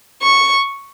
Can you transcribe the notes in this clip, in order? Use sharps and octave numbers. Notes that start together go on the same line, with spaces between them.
C#6